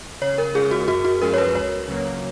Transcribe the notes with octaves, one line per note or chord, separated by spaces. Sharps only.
C#3 C#5
A#4
G#3 C#4 F4 G#4
F#4
F#2 F#4
F#4
F3 G#3 C#4 F4 A#4
C#5
B4
C#2 C#5
C#3 F#3 A#3